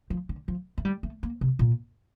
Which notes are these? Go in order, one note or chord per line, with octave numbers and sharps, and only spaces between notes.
F3
D3
F3
A3
G3
A3
A#3
C3
A#2